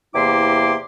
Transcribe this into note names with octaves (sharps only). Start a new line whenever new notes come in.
E2 C3 A#3 E4 C6 D6